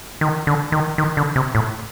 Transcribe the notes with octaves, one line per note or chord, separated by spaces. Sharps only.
D#3
D3
D#3
D#3
D3
C3
A2